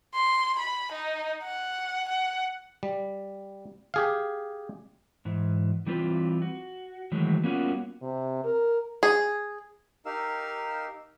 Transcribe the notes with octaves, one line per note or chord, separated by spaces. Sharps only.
C6
B5
D#4
F#5
F#5
G3
G4 G#4 F5
G#2 E3
E3 G3 C4 F4 B4
F#4
D#3 E3 F#3 G#3 A3
G3 A#3 B3 C#4 F4 F#4
C3
A#4
G#4
D#4 G4 A#4 F5 E6